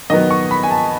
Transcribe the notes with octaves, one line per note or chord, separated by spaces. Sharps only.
D#3 F#3 B3 D#5
C#6
B5
G#5
A5